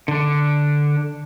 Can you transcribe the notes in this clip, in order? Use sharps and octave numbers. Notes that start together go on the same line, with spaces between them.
D3 D4